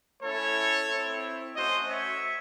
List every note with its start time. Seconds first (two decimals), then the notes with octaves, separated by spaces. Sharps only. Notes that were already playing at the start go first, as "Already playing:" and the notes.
0.23 A3 C#4 E4 A4 C#5
0.90 C4 E4
1.56 A3 C#4 F#4 C5 D#5
1.88 C#5 E5